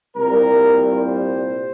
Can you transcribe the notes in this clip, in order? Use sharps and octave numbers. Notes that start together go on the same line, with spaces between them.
C2 A#2 G3 A#4
C5